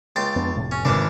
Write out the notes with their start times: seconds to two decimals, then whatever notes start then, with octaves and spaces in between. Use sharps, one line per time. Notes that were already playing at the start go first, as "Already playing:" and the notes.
0.16 C#2 G5 C6 A6
0.36 F2 B3 D4
0.55 F1 A2 C3
0.71 C#4
0.85 G#1 E3 D4 D5